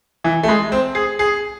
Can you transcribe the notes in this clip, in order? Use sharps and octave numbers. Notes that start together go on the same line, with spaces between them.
E3
A3
G#3
C4
G#4
G#4